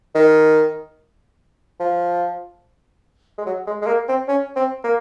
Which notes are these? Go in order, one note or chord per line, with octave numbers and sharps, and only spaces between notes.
D#3
F3
G#3
F#3
G#3
G#3
A#3
C4
C#4
C4
A#3